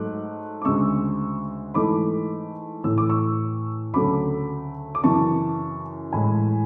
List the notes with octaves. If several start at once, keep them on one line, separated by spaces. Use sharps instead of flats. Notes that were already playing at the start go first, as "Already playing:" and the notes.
Already playing: G#2 F#3 A3 D6 F#6
D6
D2 C#3 G#3 C#6 E6
G#2 E3 A3 B5 D6
A2 E3 A3 E6
D6
C#6 E6
D2 C#3 F#3 A3 B5 D6
D6
F#2 C#3 E3 A5 C#6
A2 E3 G#3 G#5 B5